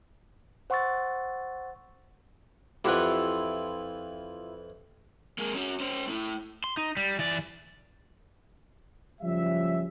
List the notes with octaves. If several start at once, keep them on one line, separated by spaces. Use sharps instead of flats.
C5 F#5 C6 C#6 E6 A6
F2 E3 E4 F4 G4 F#5
G#3 A#3
C#4 F#4
C#4 C5
A3 E4
C6
D#4
G3
E3 D5
F#1 F3 G3 C#4 E5